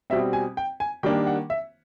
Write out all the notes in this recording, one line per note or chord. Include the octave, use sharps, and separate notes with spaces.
B2 G3 C4 E5
G#5
G5
G#5
D#3 G3 A#3 D4 G5
F#5
E5